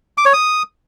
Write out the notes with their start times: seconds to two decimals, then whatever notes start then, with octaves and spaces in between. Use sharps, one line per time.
0.18 D6
0.26 C#5
0.33 D#6